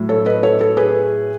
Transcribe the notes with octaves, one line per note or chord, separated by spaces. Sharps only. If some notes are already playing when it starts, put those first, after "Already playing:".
Already playing: A2 F#3
A4 C#5
B4 D#5
A4 C#5
A4
G#4 B4